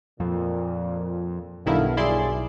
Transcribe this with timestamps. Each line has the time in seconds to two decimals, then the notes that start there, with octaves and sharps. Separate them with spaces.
0.20 F2 A#2
1.66 B1 G2 D#3 B3 E4 A4 F5
1.97 G2 F#3 E4 G#4 D5 C6